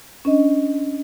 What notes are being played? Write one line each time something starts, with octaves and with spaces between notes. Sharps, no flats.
C#4 D4 D#5